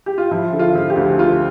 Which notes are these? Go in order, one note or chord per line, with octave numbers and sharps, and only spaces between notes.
G4
F4
F3 E4
D3
F4
F3 F4
G4
D2
D2 F4